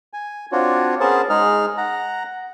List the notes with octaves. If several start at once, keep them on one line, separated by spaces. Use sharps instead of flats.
G#5
C4 D4 F4 F#4 C#5
B3 C#4 G#4 A#4 C5 A5
G#3 D#4 G#4 F6
F#5 A#5